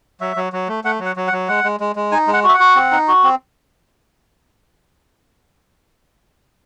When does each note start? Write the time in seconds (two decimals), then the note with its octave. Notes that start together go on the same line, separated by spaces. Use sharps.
0.21 F#3 E5
0.36 F#3
0.53 F#3
0.68 A3
0.84 A3 F#5
1.00 F#3
1.05 F#5
1.16 F#3
1.27 F#5
1.33 F#3
1.48 G#3 F#5
1.64 G#3
1.80 G#3
1.96 G#3
2.12 D#4 G#5
2.27 G#3
2.33 F#5
2.44 F#4
2.49 E5
2.54 F#5
2.60 F#4
2.76 C4
2.92 D#4
3.08 F#4
3.23 C4